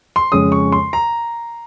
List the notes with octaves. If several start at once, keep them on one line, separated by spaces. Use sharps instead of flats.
C6
F2 C#3 G#3 C#4 D#6
C#6
C6
A#5